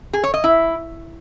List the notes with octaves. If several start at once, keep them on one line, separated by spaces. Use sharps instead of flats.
G#4
C#5
D#5
E4